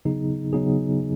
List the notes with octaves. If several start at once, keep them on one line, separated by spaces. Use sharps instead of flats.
C#3 F#3 B3 D#4 G#4
C#3 F#3 B3 D#4 G#4